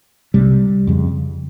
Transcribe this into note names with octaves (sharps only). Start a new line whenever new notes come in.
C2 C3 G3
F2 C#3